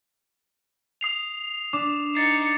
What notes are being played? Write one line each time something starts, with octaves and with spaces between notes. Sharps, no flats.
D#6 C7 F7
D4 D6
D#4 A6 C7 C#7